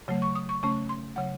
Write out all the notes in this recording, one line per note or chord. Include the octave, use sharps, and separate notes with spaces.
C#3 F#3 A3
C#6
D#6
C#6
C#3 A3 C#4 C#6
C6
C#3 F#3 F#5